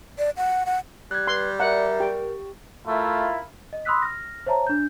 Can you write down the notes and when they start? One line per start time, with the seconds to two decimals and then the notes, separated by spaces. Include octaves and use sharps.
0.18 D5
0.37 F#5
0.66 F#5
1.11 G3 F#6 G#6
1.27 B4 C6
1.60 A#4 D5 E5 F#5 A#5
2.00 G4 G5
2.87 A3 E4 F4 A#4
3.73 D#5
3.85 B5 C6 D#6 E6 F#6 B6
4.02 F6 A#6
4.46 C5 C#5 E5 A5 A#5
4.67 D4 G6